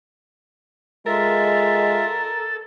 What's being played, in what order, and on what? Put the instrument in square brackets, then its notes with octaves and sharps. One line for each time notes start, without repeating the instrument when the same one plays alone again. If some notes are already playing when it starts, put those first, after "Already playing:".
[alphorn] G#3 [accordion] F4 E5 [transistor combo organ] A4 [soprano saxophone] A#4